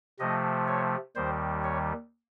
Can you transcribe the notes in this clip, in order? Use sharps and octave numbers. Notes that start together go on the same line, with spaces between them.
C3 F3 A3 D#5
C#5
D#2 D#3 G3 C5
C#5